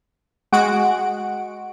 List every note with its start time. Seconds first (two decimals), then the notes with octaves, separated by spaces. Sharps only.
0.52 G#3 F#4 F#5 D7